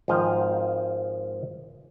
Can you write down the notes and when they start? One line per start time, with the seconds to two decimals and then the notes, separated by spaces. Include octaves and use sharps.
0.08 G#1 G#2 F3 D#5 F5 G5